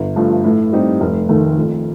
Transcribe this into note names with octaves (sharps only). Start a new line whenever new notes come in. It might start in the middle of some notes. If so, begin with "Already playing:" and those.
Already playing: G1
G2 F3 A3
A2
G3 C4 D#4 G4
F1
D#2 D#3 A3 D#4
F2